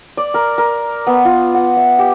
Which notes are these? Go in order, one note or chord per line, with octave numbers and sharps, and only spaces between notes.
D5
A#4
A#4
B3
F4
F#5
E5
G4